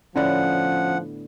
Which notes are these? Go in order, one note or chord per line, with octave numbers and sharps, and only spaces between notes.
A2 D3 F3 B3 C#4 F#5